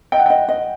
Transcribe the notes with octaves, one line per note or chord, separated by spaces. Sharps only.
D#5 G5
F#5
D#5 G5
D#5